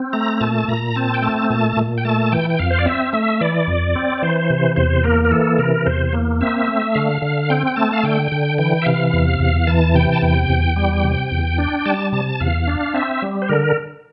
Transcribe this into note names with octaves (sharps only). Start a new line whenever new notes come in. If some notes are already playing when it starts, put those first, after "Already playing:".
Already playing: C4
A3 A#5
A#2 A5
A#2 A#5
C4 A5
G5
A3 A5
A#2 A5
A#2
G5
A3 A5
E3 G5
G5
F2 F5
C5
D5
C4 E5
A3 E5
E3 D5
F2
C4
D5
E3 C5
C3
E2 C5
A#3 A#4
A#4
E3 A4
C3 A#4
E2 C5
A#3
C4 E5
A3
D3 F5
D3
C4 G5
G5
A3 A5
F5
D3 G5
D3
E3 G5
E5
C3 F5
E2
E2
E3 A5
C3 G5
A5
E2 G5
E2
G3
C3
E2
D4
G3 A5
C3 A5
E2 F5
D4
C4 E5
G3
C5
D3 A#4